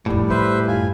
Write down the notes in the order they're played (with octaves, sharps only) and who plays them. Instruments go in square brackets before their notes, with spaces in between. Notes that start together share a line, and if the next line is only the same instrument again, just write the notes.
[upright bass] F1 A#1 [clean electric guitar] A2 [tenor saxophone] G3
[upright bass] F#3 A#3 [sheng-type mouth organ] B4 C5 E5
[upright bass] F#2 D#4 [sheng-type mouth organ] F4 G#5